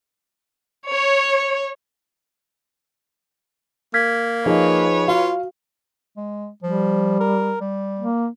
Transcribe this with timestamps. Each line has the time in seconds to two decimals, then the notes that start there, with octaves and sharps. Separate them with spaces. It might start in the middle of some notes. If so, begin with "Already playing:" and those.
0.90 C#5
3.94 A#3 F6 G#6 B6
4.46 F3 D#4 G#4 B4 C#5
5.08 F4 F#4 F5
6.17 G#3
6.63 F3 G3
7.20 A#4
7.61 G3
7.99 A#3